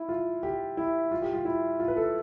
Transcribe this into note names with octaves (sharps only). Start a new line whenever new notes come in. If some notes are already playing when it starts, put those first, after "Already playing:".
Already playing: E4
F4
G4
E4
F4
G4
F4
E4
F4
B4
A4